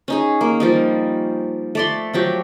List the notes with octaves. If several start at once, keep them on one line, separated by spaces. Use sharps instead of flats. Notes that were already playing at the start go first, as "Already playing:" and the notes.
C#4 D#4 G#4
A#3
F3 G3 D#4
A3 D5 C6
F3 F#3 G4